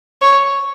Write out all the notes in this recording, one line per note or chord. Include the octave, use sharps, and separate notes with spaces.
C#5